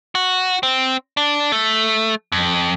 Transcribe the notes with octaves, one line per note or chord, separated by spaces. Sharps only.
F#4
C4
D4
A3
F2